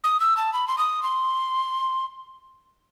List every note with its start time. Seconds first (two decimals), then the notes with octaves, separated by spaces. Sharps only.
0.04 D#6
0.20 E6
0.37 A5
0.53 B5
0.68 C6
0.78 D#6
1.03 C6